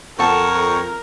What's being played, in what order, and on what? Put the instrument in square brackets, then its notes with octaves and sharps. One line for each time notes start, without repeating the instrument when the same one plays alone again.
[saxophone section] F2 [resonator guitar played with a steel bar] A4 F#5 A5 [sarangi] A#4 [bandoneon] C#6